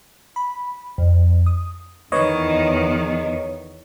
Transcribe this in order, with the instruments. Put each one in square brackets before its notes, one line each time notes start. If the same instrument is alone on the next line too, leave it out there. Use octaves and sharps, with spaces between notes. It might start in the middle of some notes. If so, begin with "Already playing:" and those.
[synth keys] B5
F2
D#6
[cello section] E2 [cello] D#3 [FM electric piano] B4 C#5 D#5